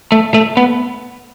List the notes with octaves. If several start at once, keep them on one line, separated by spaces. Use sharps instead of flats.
A3
A3
B3